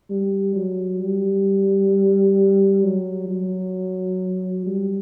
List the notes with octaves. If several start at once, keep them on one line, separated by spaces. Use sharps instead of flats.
G3
F#3
G3
F#3
F#3
G3